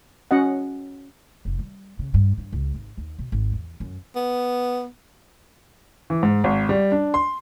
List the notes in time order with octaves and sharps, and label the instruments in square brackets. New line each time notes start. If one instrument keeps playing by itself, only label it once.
[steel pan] C#4 F#4 D#5 F#5
[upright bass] F1
G3
C#3
G2
G2
C#2
G#1
D#2
B2
G#1
E2
F#2
[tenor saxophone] B3
[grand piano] E3
G#2
G#1
G3
D4
C6